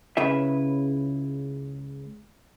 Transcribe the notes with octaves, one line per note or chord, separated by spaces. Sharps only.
C#2 C#3 E4 B4 E5